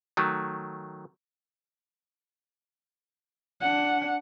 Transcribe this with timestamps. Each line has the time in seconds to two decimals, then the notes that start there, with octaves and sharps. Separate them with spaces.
0.17 D#3 F#3 A3
3.61 D4 F#5